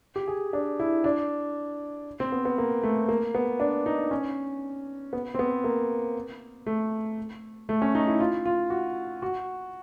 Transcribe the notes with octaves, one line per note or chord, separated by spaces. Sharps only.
G4
G#4
D4
E4
D4
C4
B3
B3
A#3
A3
A#3
B3
D4
D#4
C#4
B3
C4
B3
A#3
A3
A3
C#4
D#4
E4
F4
F4
F#4
F#4